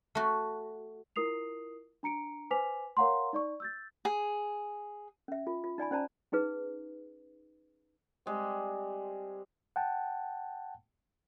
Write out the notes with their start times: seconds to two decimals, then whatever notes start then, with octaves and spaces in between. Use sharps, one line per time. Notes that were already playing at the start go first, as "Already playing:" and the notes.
0.15 A3 F#4
1.16 E4 F4 A#4 D#6 C7 F7
2.03 D4 A#5 C#7 D7
2.51 B4 C5 G#5 D6 B6 F7
2.97 A#4 C#5 F5 F#5 A#5 C6
3.33 D#4 D5 C#6
3.60 E6 G6 A6
4.05 G#4
5.28 C#4 E5
5.47 F4
5.64 F4
5.78 D#4 D5 G#5 B5
5.91 C#4 C5 D5 A5 A#5
6.32 C#4 D#4 G#4 B4
8.26 G3 G#3 C4
9.76 F#5 G5 A5